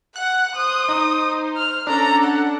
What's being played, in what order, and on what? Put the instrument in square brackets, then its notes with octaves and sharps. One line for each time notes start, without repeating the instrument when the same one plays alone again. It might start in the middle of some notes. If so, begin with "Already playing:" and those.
[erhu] F#5 [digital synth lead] F#6
[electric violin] C5 [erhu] D#6
[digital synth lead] D#4
[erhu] F6
[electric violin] C#4 A4 [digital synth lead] D4 [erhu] A#5
[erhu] F#5